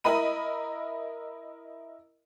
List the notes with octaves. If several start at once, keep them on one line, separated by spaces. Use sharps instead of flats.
E4 A#4 D#5 B5 D#7